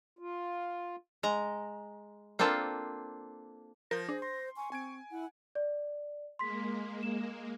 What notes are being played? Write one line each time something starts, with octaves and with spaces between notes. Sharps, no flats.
F4
G#3 A#5
A#3 C4 D4 F4 A4
F3 A#4 G6 A#6
D4 G#4 C5
C6 A#6
G#5 C#6
C4 G#5 G#6 D7
E4 F#5
D5
G#3 A#3 C6 B6
E7